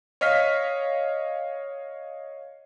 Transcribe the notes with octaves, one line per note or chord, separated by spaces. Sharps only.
C#5 D#5 F5 F6 B6